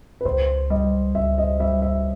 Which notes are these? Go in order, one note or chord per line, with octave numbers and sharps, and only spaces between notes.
B4
C#2 C5
G3 D#5
C#2 E5
D#5
G3 E5
E5